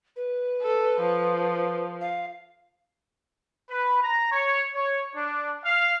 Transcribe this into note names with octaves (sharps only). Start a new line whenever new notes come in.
B4
A4
F3
F5
B4
A#5
C#5
C#5
D4
F5